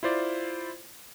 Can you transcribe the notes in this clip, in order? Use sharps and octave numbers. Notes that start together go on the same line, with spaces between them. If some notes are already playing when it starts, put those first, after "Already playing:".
E4 F4 C5 D5